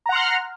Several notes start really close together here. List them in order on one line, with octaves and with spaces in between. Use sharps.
A#5 F#5 C6 F6